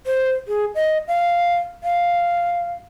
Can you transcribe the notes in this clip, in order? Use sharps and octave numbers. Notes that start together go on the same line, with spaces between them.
C5
G#4
D#5
F5
F5